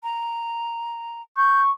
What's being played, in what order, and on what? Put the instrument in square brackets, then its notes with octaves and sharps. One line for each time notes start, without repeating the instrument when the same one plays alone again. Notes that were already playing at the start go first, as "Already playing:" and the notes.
[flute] A#5
[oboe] C#6 [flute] G6